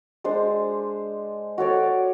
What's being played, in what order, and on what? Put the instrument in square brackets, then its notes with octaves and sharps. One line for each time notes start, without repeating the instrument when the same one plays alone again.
[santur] G#3 D4 C5
F#4 A4 C#5 D5